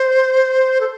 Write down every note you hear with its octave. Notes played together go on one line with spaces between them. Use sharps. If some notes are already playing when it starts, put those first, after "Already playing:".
Already playing: C5
A4